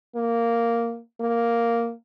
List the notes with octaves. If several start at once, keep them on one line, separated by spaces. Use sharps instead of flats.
A#3
A#3